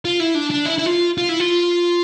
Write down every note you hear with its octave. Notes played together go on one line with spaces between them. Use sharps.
F4
E4
D4
D4
E4
E4
F4
F4
E4
F4